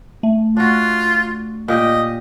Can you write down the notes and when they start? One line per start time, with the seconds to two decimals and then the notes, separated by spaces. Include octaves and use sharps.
0.23 A3
0.57 D4 F4 F#4
1.68 A#2 G4 D#5 G5